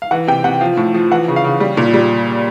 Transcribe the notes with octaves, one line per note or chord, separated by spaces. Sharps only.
F5
E3 F#5
C3 G5
C3 F#5
F3 F5
A2
F3
E3 F#5
C#3
F5
C#3
G3
A#2
G3